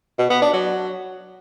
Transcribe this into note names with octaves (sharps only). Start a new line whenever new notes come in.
B2
B3
D4
F#3